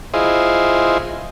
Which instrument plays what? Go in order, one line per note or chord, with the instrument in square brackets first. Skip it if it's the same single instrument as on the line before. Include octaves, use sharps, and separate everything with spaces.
[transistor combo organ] E4 F4 G#4 C5 D#5